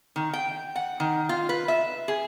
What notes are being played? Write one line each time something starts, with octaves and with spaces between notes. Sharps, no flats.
D#3
G5
F#5
D#3
F4
B4
E5
G#4